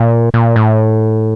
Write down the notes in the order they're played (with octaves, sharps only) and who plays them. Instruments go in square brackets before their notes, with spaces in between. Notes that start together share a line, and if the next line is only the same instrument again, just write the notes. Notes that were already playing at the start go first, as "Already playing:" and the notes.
Already playing: [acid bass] A#2
A#2
A2